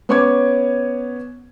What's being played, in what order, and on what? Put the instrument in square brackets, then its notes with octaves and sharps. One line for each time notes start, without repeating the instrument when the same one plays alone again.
[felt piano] B3 C#4 C#5 C#6 D6 G#6